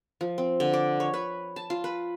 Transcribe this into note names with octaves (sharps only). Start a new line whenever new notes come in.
F3
C4
D3
D5
C#5
B4
A5
F4
B4